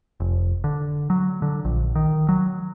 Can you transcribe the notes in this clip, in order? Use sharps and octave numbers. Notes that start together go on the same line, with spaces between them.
F1
D3
F#3
D3
A#1
D#3
F#3